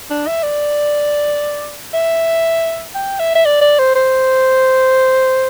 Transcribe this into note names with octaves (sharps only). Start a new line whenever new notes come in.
D4
E5
D5
E5
G5
E5
E5
D5
D5
C5
C5